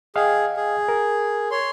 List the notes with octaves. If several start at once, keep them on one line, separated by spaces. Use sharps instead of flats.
G#4 D#5 F5 G5
G#4
A#4
C#5 C6